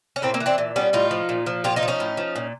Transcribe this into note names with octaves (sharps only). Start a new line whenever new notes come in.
C#4
A2 A#3 C4
A#3 C4
E3
C4 D4
A#2
G3 B3 C#4
A2 D#4 F4
F3
A#2
F3
A#2 F4 G4
D#4 F4
F3
C#4 D#4
A2
F3
A#2